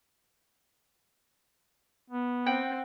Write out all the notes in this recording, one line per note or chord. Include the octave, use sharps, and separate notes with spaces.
B3
C4 F#5 G5